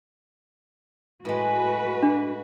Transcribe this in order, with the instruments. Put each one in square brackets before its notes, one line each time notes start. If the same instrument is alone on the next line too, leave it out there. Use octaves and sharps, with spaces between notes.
[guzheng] A2 G#3 [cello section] F#4 B4
[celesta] D4